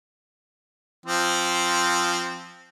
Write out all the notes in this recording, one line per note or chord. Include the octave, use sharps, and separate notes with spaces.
F3 C4